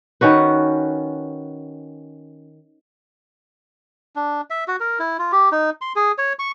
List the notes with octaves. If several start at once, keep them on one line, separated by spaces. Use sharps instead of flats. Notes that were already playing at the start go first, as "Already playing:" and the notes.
D#3 C#4 F#4 B4
D4
E5
F#4
A#4
E4
F4
G4
D#4
C6
G#4
C#5
C#6